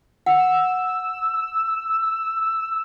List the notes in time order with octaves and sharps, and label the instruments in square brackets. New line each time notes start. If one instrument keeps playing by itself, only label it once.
[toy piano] F#5 [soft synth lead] E6